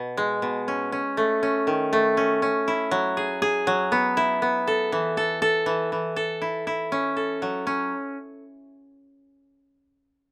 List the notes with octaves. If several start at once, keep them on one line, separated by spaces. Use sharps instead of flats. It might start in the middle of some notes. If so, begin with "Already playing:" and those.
Already playing: B2
G#3
B2
C#4
C#4
A3
C#4
D#3
A3
C#4
C#4
E4
F#3
G#4
G#4
F#3
B3
E4
B3
A4
E3
A4
A4
E3
E3
A4
E4
E4
C#4
A4
F#3
C#4